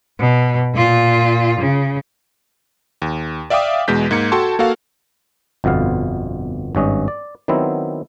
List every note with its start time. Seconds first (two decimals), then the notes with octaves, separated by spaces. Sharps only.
0.20 B2
0.74 A#2 F4
1.60 C#3
3.02 D#2
3.50 D5 E5 F5 G5 D6 D#6
3.88 E2 B2 G#3 G6 B6
4.11 G#2 A#3 G#6 C#7
4.32 F#4 A4 G5 A5 C6 C#6
4.59 A#3 F#4 A4 F5
5.64 G1 F2 B2 B3 F5
6.75 G#1 G2 C#4 D#5
7.08 D5
7.48 D#3 F#3 B3 C4 E4